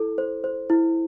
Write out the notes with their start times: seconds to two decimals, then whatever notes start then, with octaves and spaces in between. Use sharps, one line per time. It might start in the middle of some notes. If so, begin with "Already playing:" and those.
Already playing: E4 A4
0.18 C5
0.44 C5
0.70 E4